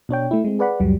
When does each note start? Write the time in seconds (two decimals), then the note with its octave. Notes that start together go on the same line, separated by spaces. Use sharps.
0.09 B2 D4 C#5 G5
0.31 A3 E4
0.44 G#3 C4
0.59 G#4 B4 D5 F#5 B5
0.80 C#2 F#2 F#3 G3